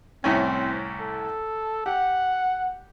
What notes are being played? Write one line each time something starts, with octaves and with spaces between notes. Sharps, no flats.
C2 A2 C4 C#4
A4
G4 F#5